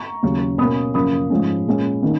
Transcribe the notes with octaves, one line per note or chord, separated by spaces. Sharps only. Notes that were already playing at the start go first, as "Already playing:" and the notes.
Already playing: A#5 C#6
D#2 C#3 F#3 C#4
B2 A#3 C#4 B5 D#6
F#2 C#3 F3 A#3 C#4 B5 D#6
G#2 F3 G#3 C#4
A#2 G#3 C#4
D#3 A#3 C#4